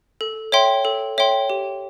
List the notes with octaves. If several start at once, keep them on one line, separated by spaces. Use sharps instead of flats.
A4
C#5 E5 G5 C6
A4
C#5 E5 G5 C6
G4